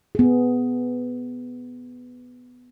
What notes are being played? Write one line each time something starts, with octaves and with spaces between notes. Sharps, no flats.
B3 G#4